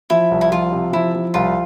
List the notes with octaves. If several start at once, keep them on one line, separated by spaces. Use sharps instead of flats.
F3 E4
C2
E4
F3 F4
C3
F3 E4
F3
C2 F4